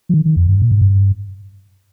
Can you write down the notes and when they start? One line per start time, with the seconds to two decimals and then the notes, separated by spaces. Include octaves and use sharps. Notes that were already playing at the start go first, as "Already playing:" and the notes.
0.09 F3
0.14 D#3
0.25 D#3
0.37 F2
0.48 G2
0.62 A#2
0.71 G#2
0.81 G2